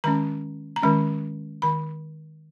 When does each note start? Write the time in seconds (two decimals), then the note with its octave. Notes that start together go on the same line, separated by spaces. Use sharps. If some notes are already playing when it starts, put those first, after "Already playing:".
0.04 D#3 G#3 C#4 A#5
0.76 A#5
0.83 D#3 G#3 C#4 B5
1.62 D#3 B5